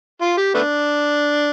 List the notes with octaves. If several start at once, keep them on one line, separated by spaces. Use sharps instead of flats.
F4
G4
A3 B3 D4